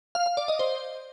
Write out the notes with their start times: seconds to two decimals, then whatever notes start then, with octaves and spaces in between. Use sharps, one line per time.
0.15 F5
0.26 F5
0.37 D5
0.48 D#5
0.59 C5